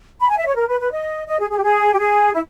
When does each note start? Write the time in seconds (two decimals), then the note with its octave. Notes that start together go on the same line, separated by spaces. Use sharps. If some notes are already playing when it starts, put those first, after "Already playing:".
0.20 B5
0.29 G#5
0.38 E5
0.46 C#5
0.55 A#4
0.68 B4
0.80 B4
0.91 D#5
1.27 D#5
1.39 G#4
1.50 G#4
1.57 G4
1.63 G#4
1.92 G4
1.98 G#4
2.33 E4